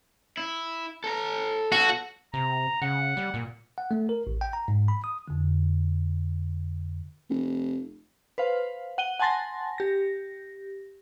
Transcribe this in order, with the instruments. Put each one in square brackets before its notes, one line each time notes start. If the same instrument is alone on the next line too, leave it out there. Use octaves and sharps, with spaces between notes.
[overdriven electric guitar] E4
A4 A#5
[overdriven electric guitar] B2 A4 [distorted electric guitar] F#4
[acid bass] C3 [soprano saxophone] A#5
[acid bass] C#3 [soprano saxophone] F#5
[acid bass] G3
A#2
[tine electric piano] F#5
A3
A#4
A1
G5
A#5
G#2
B5
D#6
[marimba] F2 D3
[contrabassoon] F1
[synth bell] B4 C5 F5
F#5 D#7 G7
F#5 G#5 A5 C6 A6 A#6
G4 A#6